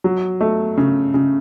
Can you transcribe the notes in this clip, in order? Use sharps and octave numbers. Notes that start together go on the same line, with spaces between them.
F#3
A3
C#3
C#3